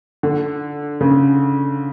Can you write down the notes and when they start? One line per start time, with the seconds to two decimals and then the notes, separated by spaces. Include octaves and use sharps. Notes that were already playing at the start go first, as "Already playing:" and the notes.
0.23 D3
1.01 C#3